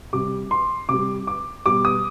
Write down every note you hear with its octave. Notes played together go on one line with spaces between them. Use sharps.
C3 G3 D6
C6
C3 G3 D6
D6
B2 G3 D6
D#6